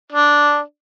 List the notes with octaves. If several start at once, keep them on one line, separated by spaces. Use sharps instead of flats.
D4